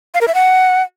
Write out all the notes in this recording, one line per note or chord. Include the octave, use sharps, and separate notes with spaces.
F5
A#4
E5
F#5